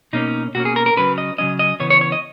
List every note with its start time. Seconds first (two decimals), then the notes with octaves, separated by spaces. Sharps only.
0.13 B2 A#3 C#4 D#4
0.55 B2 A#3 C#4 F#4
0.65 G#4
0.76 A#4
0.86 A#4
0.97 C#3 F#3 C#4 B4
1.18 D#5
1.38 C#3 F#3 C#4 D#5
1.59 D#5
1.80 C#3 E3 B3 C#5
1.90 C#5
2.01 C#5
2.12 D#5